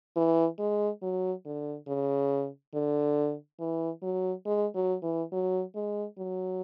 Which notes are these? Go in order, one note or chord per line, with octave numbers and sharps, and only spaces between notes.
E3
G#3
F#3
D3
C#3
D3
E3
F#3
G#3
F#3
E3
F#3
G#3
F#3